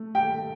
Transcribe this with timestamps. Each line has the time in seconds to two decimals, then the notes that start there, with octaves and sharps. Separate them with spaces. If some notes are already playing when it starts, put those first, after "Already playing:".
Already playing: A3
0.15 G5